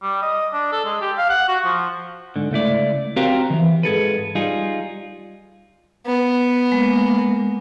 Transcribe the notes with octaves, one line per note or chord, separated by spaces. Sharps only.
G3
D#5
D4
A4
G#3
G4
F5
F#5
F#4
F3
G#2 D3
C#2 A3 E4 D5
C4 F#4 G4 A#4 C5 F5
D#3 E3
G#2 G#4 A4 B4
G3 D#4 F4 G#4
B3
G#3 A#3